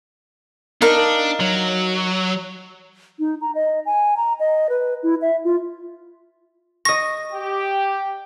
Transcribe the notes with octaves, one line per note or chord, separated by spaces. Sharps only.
D4 D#4 A#4 F5
F#3
D#4
A#5
D#5
G#5
A#5
D#5
B4
E4
E5
F4
D#5 C#6 A#6
G4